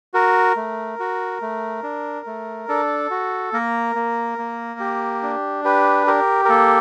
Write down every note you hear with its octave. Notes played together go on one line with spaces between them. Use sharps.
F#4 A#4
A3
F#4
A3
D4
A3
D4 A4
F#4
A#3 A#4
A#3
A#3
G4
D4
G4 B4
G4 A#4
A#4
A#3 A4